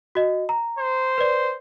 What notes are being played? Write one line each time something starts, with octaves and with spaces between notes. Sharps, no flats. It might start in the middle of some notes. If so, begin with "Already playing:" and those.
F#4 D#5
A#5
C5
B4 D5